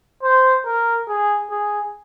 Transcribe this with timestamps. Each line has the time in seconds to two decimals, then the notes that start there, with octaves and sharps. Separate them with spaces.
0.23 C5
0.65 A#4
1.08 G#4
1.51 G#4